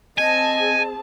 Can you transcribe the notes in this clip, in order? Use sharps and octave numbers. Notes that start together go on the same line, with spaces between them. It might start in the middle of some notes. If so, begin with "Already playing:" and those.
C4 G#4 D#5 G#5 A5